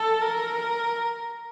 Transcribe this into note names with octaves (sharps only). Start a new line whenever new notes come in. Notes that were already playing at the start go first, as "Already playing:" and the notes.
Already playing: A4
A#4